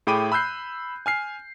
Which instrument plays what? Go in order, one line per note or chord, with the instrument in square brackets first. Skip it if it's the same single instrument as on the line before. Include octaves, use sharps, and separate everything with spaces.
[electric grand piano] A2 G#4 G5 B5 D6 D#7
B5 E6 F#6 G6 C7
G#5 F6 C7